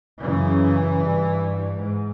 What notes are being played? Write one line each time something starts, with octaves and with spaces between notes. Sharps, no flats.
F#2 C#3 E3
G2
G#2